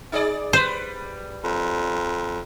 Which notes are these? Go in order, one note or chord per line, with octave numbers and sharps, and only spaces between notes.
D#4 G#4 D5
G3 B4 C5
F2